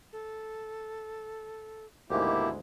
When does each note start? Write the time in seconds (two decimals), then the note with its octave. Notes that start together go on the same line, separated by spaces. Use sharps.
0.13 A4
2.10 D2 G#2 B2 D#3 G#3 A#3 E4 G4